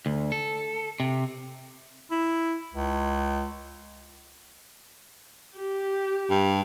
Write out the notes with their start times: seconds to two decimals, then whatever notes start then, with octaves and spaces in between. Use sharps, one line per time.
0.06 D2
0.32 A4
1.00 C3
2.11 E4
2.74 C#2
5.57 G4
6.30 G2